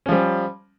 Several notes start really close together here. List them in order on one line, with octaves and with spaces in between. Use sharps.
C#4 F3 G3